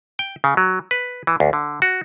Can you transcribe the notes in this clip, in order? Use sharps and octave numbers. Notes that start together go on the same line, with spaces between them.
G5
C#3
F#3
B4
E3
D2
D3
F#4